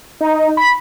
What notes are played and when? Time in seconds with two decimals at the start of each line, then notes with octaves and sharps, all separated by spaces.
0.21 D#4
0.57 B5